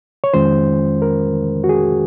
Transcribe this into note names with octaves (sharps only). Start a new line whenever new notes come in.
C#5
F2 D#3 G#3 C#4 F4 C5
A#4
F#4
G#4